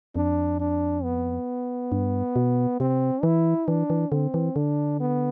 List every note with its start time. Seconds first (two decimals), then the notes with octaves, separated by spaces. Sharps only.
0.16 F2 D4
0.60 D4
1.04 B3
1.92 G2
2.36 B2
2.80 C3 C4
3.23 E3 E4
3.68 E3 D4
3.90 E3
4.12 D3 C4
4.34 E3
4.56 D3 D4
5.00 B3